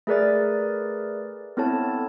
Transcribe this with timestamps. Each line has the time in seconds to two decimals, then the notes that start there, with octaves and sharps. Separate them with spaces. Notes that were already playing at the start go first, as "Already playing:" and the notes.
0.07 A3 G#4 A#4 B4 D5 A6
1.57 B3 C4 E4 A4 C#5 A5